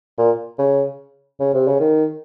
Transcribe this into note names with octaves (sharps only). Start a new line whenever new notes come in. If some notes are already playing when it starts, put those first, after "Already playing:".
A#2
C#3
C#3
C3
C#3
D#3